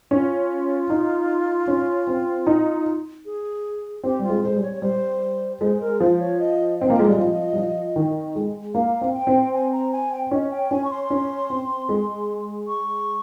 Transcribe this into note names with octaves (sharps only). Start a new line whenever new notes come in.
C#4 F4
D#4
C#4
C4
D#4
G#4
C4 G4
G3 F4
G#3
G#3 C5
G3
C#5
C#5
G3 C5
G#3 C5
A#4
F3 C5
C#5
D#5
C4 D#5
A#3
G#3
G3
F3
G3
F3
D#3
G#3
A#3 F5
C4
G5
C4
G#5
A#5
G#5
G5
C#4 D#5
G5
C#4 G#5
C#6
C6
C#4
C4
G#3
C#6